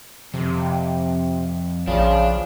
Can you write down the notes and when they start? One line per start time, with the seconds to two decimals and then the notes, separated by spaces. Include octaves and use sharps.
0.34 F2 C3
1.88 A#1 C#3 F3 D4